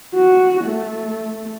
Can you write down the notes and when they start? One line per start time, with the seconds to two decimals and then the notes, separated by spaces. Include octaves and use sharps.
0.14 F#4
0.64 A3